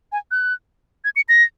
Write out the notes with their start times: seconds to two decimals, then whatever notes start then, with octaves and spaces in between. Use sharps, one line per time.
0.12 G#5
0.31 F#6
1.05 G#6
1.16 C#7
1.29 A#6